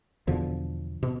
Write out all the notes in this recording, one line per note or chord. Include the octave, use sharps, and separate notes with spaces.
E2 B2 D3 F3
B2